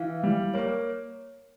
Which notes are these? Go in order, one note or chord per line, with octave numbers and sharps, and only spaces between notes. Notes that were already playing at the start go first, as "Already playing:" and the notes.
Already playing: E3 F5
G3
A#3 C#5